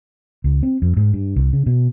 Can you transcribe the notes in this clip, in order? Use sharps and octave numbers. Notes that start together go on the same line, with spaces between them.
C#2
C4
F2
G#2
G2
C2
C#3
B2